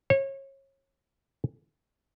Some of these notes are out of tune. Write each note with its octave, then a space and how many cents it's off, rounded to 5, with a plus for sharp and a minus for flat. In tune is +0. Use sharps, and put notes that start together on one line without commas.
C#5 -30